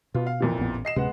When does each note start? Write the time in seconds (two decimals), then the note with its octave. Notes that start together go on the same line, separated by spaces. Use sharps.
0.14 B2 B3 F4
0.27 F5
0.40 F2 A#2 E3
0.58 A1 B3
0.85 D#5 C7 E7
0.96 D1 C3 G#3 B3 C#4 F#5